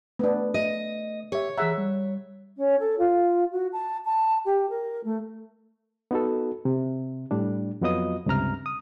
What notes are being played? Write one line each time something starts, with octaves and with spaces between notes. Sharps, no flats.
A3 B3 D4
D#5
G4 C#5 E5
E3 G#4 E5 F#5 A#5
G3
C#4
A4
F4
F#4
A5
A5
G4
A#4
A3
B3 D#4 F#4 A4
C3
A2 G3 D4
F2 F#3 B3 F4 D#5 D#6
C#2 G2 C3 A#5 F6
D#6